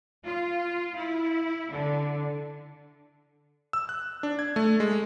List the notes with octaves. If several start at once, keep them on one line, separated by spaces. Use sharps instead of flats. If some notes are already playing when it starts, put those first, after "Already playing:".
F4
E4
D3
E6
F#6
D4
G#6
A3
G#3